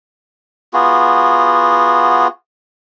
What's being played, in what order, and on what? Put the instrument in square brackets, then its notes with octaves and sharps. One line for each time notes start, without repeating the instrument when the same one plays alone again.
[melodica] B3 F4 F#4 G#4